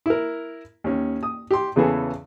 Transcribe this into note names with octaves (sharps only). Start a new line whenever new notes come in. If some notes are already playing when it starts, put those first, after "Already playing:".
E4 A#4
D#2 C#4
D#6
G4 C6
E2 C#3 E3 B3 G#4 A4